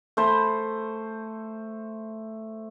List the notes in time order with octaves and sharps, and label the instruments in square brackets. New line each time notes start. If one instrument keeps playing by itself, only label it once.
[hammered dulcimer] A3 C5 B5